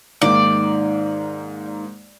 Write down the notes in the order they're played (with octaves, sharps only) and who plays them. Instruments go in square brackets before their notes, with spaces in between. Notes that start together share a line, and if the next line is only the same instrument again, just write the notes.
[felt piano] G#2 D#3 A#3 [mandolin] D5